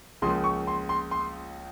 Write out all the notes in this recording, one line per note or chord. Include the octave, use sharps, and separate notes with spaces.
C#2 C#3 F3 A#3 C6
C#6
C6
C6
C6